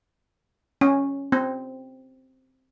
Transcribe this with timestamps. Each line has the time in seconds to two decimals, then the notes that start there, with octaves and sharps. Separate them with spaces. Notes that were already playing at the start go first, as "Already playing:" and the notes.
0.81 C#4
1.32 C4